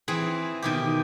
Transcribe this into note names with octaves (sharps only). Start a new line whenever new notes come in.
E3 C4 G#4 B4
B2 D#3 G4